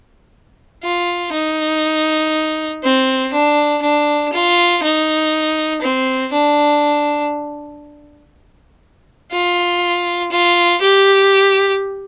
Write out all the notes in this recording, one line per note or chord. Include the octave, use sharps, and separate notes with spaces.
F4
D#4
C4
D4
D4
F4
D#4
C4
D4
F4
F4
G4